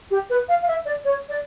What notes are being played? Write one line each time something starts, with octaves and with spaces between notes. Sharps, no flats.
G4
B4
F5
F5
E5
D5
C#5
D5